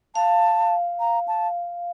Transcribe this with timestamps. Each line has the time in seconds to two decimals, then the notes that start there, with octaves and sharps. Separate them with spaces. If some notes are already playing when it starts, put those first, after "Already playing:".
0.15 F5 A5
1.00 A#5
1.28 A5